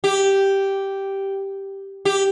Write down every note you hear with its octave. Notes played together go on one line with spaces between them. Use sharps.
G4
G4